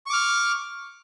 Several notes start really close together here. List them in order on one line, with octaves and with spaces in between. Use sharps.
C#6 D6 F6